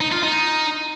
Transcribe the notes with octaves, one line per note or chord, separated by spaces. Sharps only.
D#4
F4
D#4